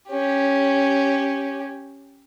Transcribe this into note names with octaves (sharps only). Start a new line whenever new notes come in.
C#4 G4